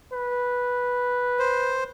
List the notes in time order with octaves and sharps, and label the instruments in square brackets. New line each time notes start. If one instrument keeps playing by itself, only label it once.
[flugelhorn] B4
[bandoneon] C5